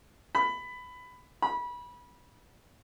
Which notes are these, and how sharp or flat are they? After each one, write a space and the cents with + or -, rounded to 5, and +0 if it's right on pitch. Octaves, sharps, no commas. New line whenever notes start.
B5 +15
B5 -25